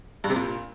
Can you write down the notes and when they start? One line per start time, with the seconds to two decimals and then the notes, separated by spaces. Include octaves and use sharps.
0.24 G2
0.30 C3
0.36 A#2